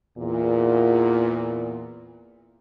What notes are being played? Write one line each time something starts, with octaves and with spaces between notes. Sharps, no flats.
E2 A#2